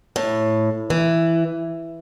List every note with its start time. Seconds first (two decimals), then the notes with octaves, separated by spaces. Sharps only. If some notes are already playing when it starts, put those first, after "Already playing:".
0.16 A2
0.90 E3